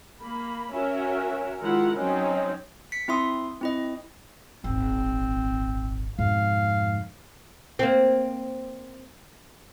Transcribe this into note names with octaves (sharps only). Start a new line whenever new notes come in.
A#3 B5
C#4 F#4 A#4 E5
D#3 G#3 E4 F4 A#4 F#5
F#3 C4 C#4 D#4
B6 C#7
C4 E4 E5 C6 D#6
C4 E4 D#5
D#1 G#1 C4
F2 G#2 B2 F5
A#3 C4